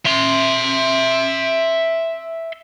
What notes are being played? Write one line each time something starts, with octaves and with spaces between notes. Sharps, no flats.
E5 C6